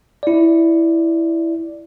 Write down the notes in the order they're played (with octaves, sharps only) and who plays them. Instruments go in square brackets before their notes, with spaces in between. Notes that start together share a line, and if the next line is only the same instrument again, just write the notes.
[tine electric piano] E4 D5